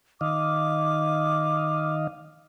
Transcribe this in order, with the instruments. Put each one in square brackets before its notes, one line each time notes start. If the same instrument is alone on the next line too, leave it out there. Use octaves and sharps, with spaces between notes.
[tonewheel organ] D#3 D#5 F5 [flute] D6